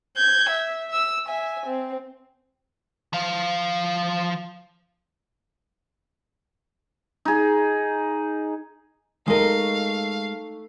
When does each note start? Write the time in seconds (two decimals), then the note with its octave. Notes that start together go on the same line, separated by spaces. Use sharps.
0.17 G6 G#6
0.49 E5
0.93 E6
1.26 E5 G#5
1.66 C4
3.13 F3 F5
7.25 D#4 G#4
9.28 G#3 A3 D#4 A#4 B4 D#5 F5